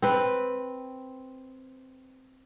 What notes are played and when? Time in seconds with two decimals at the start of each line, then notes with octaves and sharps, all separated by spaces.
0.02 C4 B4